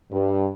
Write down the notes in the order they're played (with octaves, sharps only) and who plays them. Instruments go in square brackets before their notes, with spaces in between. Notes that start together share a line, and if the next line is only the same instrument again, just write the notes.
[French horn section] G2